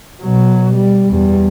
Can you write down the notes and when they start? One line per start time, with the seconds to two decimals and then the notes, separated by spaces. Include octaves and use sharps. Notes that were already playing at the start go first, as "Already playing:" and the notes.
0.22 B2 F#3
0.75 G3
1.10 E2 G3